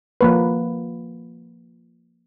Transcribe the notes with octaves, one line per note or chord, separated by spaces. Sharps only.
F3 A#3 B4